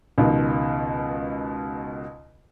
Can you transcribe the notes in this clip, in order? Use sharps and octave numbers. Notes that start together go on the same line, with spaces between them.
C#2 B2 D#3